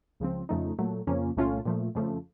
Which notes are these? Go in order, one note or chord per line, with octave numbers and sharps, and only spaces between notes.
C#2 C#3 F3 C4
F2 C#3 F3 A3 D#4
A#2 F#3 A3
F2 C#3 F3 A#3 C#4
C2 A#2 A3 C#4 F4
A#2 F3 A3
F2 C#3 F3 A3